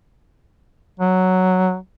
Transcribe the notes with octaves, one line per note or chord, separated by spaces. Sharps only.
F#3